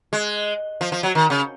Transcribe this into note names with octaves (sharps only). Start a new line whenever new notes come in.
G#3
F3
F3
F#3
D#3
C#3